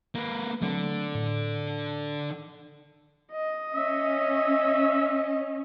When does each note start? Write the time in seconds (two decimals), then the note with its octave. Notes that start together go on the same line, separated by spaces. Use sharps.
0.15 A#3 B4
0.62 D3 F#3 A3 C4
1.15 A2
3.32 D#5
3.74 C#4 E5